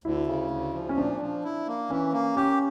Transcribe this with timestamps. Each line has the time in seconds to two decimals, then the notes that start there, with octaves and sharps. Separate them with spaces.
0.04 D2 E4
0.27 C#3
0.51 D2
0.74 F3
0.89 C#4
0.97 A#2 D4
1.20 F3
1.44 E4
1.67 A#3
1.90 E3 C#4
2.13 A#3
2.36 C#4 G4